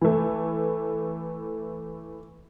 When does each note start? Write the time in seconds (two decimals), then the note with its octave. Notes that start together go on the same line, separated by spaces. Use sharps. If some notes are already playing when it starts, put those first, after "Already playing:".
0.01 E3 A3